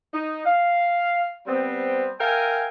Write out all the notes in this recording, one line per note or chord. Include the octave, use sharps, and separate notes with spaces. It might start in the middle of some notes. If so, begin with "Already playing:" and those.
D#4
F5
G3 B3 C4
A#4 E5 F5 G5 G#5